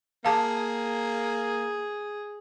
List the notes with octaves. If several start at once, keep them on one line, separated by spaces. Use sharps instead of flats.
A#3 G#4 F5 A5 D6